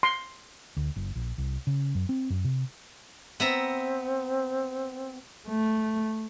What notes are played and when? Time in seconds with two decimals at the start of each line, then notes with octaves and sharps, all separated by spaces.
0.03 C6
0.77 D2
0.96 F#1
1.15 A#1
1.38 C2
1.67 C#3
1.95 F#2
2.09 C4
2.30 F#2
2.44 C3
3.40 B3 C4 E5 A#5
5.47 A3